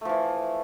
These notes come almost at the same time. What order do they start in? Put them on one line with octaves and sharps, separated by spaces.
A3 F3 E3